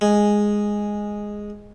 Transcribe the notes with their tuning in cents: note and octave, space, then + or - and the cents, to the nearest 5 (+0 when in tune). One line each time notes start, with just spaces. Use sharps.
G#3 -5